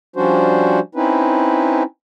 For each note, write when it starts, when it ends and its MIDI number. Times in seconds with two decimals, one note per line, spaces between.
0.16 0.80 53
0.16 0.80 55
0.16 0.80 61
0.16 0.80 62
0.16 0.80 66
0.16 0.80 72
0.95 1.83 60
0.95 1.83 61
0.95 1.83 63
0.95 1.83 64
0.95 1.83 71